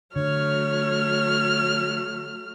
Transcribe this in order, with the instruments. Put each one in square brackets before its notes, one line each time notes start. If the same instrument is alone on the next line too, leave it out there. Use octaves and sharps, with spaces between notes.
[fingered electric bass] D3 [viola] F#3 A3 [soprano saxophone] C#5 [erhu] F6